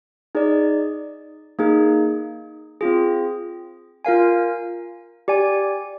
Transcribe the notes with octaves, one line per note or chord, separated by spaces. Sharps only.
D#4 G#4 D5
A#3 D#4 G#4
C4 F4 G#4
F4 A#4 F5 G#5
G4 D5 G#5